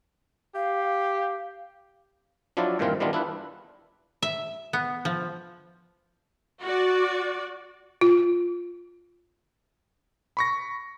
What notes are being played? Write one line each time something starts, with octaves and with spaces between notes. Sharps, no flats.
G4 F5
F3 F#3 D4 E4 F4 D5
G2 A#2 D#3 E3 C4 F4
D#3 E3 G3 B3 D4 F4
D4 E4 F4 B4
E5
B3
F3
F#4 D5
F4
B5 C#6 A#6